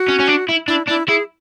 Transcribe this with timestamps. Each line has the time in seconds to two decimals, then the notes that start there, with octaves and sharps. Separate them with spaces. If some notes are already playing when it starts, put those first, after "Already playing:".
Already playing: F#4
0.08 C#4
0.19 C#4
0.27 D4
0.49 E4
0.68 D4 E4
0.88 D4 E4
1.08 E4 G#4